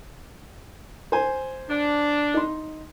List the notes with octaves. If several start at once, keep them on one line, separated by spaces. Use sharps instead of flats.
C5 G#5
D4
D#4 C6